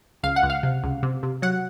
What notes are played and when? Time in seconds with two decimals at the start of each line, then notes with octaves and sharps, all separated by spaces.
0.23 C#2 F5
0.36 F#5
0.43 C#2
0.50 F5
0.63 C3
0.84 C#2
1.03 C3
1.23 C3
1.42 F#3 F#5